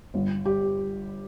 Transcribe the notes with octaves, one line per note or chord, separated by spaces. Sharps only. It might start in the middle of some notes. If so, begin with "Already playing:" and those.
G1
G3 G4